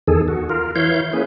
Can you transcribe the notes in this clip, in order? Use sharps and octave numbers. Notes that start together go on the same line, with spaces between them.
E2 D#3 G#4 A4
F#4
F4 A#4
E3 E4 C#5 F5 G6
A#3 C#4 E4 G#4 B4